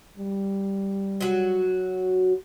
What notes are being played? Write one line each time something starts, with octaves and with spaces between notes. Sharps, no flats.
G3
F#3 F#4